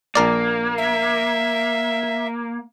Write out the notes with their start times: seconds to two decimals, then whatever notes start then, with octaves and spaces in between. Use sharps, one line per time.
0.15 A#1 A#3 A#4 D5
0.78 E5